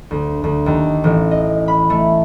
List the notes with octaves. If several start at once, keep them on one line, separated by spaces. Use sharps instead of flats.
D2
D2
D#2
A1
D#5
B5
A3